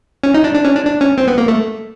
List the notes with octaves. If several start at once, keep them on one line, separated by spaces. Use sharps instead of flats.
C#4
D#4
D4
D4
C#4
D4
D4
C#4
C4
B3
A#3
A3